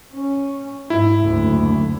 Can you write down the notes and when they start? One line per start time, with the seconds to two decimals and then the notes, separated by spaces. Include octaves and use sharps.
0.12 C#4
0.90 G#2 E4
1.20 F#1 D2